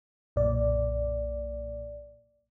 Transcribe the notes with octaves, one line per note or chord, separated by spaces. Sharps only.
B1 F#2 A#2 D5